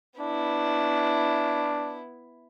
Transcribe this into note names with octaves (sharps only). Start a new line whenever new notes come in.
B3 D4 E4